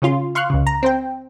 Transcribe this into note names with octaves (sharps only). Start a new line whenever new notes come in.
C#3 C#4 F4 C6
F5 C6 C#6 F6 F#6
C#2 C#3
A#5
C4 C5 G5